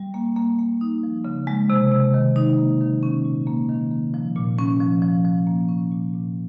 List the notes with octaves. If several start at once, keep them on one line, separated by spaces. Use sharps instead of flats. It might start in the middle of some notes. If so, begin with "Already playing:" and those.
Already playing: G3
A#3
A#3
A#3
D#4
F3
C#3
G#3
C3
C3
D#3
D#4
A#3
D#3
C#4
A#2
A#3
D#3
A#3
F3
A#2
C#4
F3
F3
F3
A#3
C#4
A#2
A#2